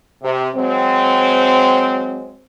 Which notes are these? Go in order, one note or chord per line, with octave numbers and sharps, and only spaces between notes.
C3
F#3 G#3 C4